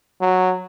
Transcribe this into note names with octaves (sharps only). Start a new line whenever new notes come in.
F#3